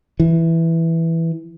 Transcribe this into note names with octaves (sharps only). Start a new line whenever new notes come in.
E3